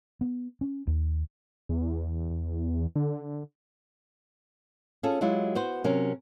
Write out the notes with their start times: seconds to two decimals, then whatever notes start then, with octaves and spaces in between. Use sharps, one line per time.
0.21 B3
0.61 C#4
0.87 D#2
1.69 E2
2.30 E2
2.96 D3
5.03 C#4 F4 G#4 A4
5.21 F#3 G#3 E4 F4 G4
5.55 B3 F#4 C5
5.84 C3 F#3 C#4 A#4